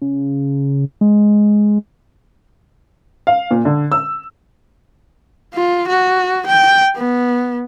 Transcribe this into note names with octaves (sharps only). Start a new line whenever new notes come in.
C#3
G#3
F5
A#2
D3
E6
F4
F#4
G5
B3